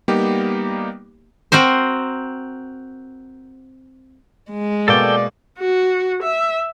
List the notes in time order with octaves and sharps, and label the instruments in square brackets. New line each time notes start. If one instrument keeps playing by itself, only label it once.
[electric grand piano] G3 A#3 B3 D#4 G4
[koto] C4 F#4 A#4 C5
[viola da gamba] G#3
[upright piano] B2 A#3 [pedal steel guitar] A4 G5 [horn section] D5
[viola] F#4
E5